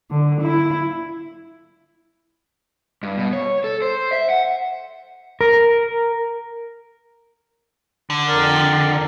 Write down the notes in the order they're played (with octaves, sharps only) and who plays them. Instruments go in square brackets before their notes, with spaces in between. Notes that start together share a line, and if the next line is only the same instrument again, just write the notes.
[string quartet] D3
E4
[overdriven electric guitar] G2
B2
C#5
A4
C5
E5
F#5
[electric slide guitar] A#4
[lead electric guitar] D3
[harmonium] F2 A#4 D5